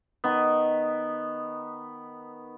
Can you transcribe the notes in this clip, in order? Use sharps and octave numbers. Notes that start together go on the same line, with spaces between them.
D#3 B3